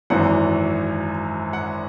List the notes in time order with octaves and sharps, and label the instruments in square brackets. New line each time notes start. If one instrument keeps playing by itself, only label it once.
[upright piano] G#1 F#2 E3 F#5
F#5